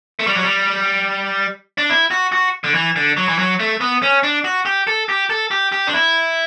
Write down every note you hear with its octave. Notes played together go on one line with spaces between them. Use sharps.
A3
G3
F#3
G3
D4
E4
F#4
F#4
D3
E3
D3
F#3
E3
F#3
A3
B3
C#4
D4
F#4
G4
A4
G4
A4
G4
G4
D4
E4